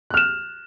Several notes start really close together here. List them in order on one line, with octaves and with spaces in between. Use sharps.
F#6 F6 E7